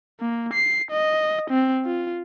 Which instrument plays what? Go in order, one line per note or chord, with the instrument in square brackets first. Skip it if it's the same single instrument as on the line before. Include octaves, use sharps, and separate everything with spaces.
[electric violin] A#3
C7
D#5
C4
F4